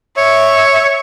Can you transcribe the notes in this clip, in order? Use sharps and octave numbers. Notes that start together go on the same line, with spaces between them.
C#5 E5